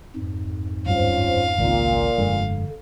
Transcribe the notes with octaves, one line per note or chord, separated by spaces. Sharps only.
F2 G#2
D1 G2 C#4 F4 C5 F5
G#1 C#2 A#2
F1 G2 D3 G#3